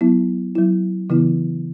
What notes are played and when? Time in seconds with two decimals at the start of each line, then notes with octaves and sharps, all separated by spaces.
0.01 F#3 B3 E4
0.55 F#3 E4
1.10 C#3 E3 B3 E4